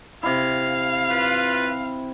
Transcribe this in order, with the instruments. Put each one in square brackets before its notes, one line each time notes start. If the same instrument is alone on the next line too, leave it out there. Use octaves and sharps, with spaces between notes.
[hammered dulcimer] C3 E4 [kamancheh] F5
[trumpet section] F4 B4